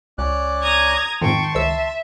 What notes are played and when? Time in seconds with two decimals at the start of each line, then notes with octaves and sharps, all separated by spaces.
0.18 C#2 C#4 D5 F#6
0.62 A#5 D#6 G#6
1.21 F2 G#2 D#3 G5 A5 C6 C#6
1.55 C#2 E5 E6